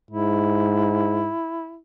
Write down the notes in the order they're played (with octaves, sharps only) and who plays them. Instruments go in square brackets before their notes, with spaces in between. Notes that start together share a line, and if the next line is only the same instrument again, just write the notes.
[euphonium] G#2 [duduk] E4